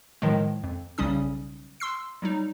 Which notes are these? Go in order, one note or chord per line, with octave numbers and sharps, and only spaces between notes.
A2 D#3 F3 F#3 G#3
F2
B1 C#3 G3 C#4 D#6
C6 E6 C7
F#3 G3 D#4